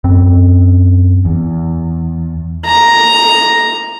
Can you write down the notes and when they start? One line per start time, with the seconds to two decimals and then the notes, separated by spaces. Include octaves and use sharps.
0.04 F#2 C4
1.25 E2
2.66 A#5